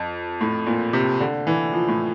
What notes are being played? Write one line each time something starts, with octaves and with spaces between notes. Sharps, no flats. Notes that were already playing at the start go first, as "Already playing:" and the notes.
Already playing: F2
A2
A#2
C3
D3
E3
F3
A2